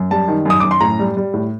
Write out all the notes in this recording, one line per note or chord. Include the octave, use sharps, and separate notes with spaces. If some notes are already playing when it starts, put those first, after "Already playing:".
Already playing: F#2
G3 A5
D#3
F#2 D#6
F#2 D6
C6
A2 A#5
G3
G3
A2